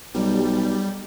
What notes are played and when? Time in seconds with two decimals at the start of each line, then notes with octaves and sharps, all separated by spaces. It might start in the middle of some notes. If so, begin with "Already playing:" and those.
0.14 B1 G3